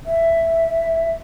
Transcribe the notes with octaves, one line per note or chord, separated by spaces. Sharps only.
E5